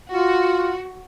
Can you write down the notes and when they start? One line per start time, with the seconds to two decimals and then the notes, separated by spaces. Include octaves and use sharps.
0.12 F4 F#4